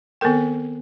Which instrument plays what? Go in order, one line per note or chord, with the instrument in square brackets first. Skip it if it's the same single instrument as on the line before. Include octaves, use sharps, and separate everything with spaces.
[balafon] D#3 B3 C4 A4 A#4 G5